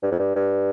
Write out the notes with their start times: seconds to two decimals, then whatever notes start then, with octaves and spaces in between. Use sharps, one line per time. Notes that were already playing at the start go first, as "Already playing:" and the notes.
0.03 G2
0.11 F2
0.19 G2
0.35 G2